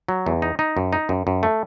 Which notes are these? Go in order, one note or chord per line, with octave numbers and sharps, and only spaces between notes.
F#3
E2
D#4
D#4
F#2
D#4
F#2
F#2
A3